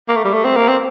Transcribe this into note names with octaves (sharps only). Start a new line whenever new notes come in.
A#3
A3
G3
A3
C4
A#3
C4